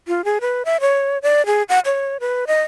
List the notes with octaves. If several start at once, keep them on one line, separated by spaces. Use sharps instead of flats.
F4
G#4
B4
E5
C#5
D5
G#4
F#5
C#5
B4
D#5